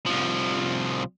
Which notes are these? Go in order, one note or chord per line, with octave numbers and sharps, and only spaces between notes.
C2 F3